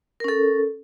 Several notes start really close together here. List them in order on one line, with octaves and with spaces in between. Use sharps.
A#4 C#4 A4